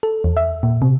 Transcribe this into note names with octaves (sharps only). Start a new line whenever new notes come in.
A4
E2
E5
A#2
C3